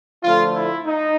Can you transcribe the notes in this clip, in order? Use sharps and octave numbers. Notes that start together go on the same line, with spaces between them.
D3 F3 A3 F4
E4
D#4